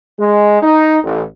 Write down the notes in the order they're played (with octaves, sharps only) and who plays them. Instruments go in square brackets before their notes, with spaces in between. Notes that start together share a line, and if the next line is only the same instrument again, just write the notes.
[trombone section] G#3
D#4
A1